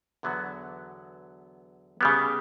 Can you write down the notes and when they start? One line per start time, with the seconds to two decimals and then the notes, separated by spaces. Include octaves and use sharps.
0.23 E2 D3 F#3 B3 F#4
2.01 C#3 G3 B3